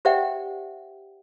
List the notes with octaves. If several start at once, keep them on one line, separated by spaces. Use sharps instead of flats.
G4 C5 D5 E5 F#5 G5